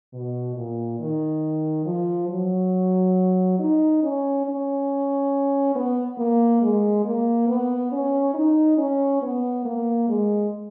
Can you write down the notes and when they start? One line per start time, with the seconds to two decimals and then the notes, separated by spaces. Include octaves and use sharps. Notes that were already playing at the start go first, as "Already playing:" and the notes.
0.14 B2
0.56 A#2
1.00 D#3
1.86 F3
2.29 F#3
3.59 D#4
4.03 C#4
4.45 C#4
5.75 B3
6.18 A#3
6.62 G#3
7.04 A#3
7.48 B3
7.92 C#4
8.34 D#4
8.77 C#4
9.22 B3
9.65 A#3
10.08 G#3